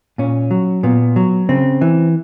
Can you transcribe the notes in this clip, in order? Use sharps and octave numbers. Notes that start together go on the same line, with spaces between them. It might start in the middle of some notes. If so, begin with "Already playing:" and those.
A#2 C#4
F#3
A#2 B3
F#3
C#3 C4
E3